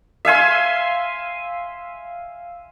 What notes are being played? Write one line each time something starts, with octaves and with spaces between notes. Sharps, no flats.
E5 F5 G#5 C6